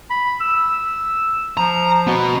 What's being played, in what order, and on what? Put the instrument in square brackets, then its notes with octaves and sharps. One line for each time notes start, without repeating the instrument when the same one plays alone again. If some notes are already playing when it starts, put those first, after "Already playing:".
[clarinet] B5
E6
[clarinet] F3 [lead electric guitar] A#5
[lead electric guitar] B3 F#4